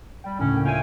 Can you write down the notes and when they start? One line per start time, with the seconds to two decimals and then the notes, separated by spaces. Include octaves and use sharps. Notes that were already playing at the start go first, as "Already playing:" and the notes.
0.24 G3 G5 B5
0.39 D2 A2 C#3 C#4
0.53 A#3 G5
0.65 F4 C#5 E5 F5 G5 G#5